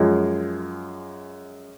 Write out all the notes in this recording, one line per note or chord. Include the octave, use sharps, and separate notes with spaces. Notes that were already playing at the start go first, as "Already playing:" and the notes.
Already playing: F#2 F3 G#3